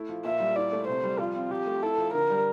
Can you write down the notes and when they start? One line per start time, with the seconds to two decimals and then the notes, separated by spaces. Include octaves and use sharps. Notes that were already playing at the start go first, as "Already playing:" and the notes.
Already playing: A3 E4
0.09 F3
0.24 A#2 E5
0.40 G3
0.56 E4 D5
0.72 A3
0.88 C3 C5
1.03 G3
1.19 F3 F4
1.35 C4
1.51 F3 G4
1.67 A3
1.83 E4 A4
1.98 F3
2.13 D3 A#4
2.30 G3